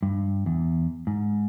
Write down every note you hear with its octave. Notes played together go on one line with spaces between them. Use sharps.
G2
E2
G#2